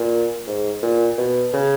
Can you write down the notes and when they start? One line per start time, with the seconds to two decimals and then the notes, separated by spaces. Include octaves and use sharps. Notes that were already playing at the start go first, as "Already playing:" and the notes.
Already playing: A#2
0.47 G#2
0.83 A#2
1.18 B2
1.54 C#3